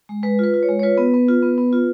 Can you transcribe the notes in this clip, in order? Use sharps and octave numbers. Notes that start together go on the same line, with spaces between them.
G#3
G#3 B4
F4 B4
F4
C#5
G#3
C#5
F4 B4
B3
B3
F4
B3
B3
F4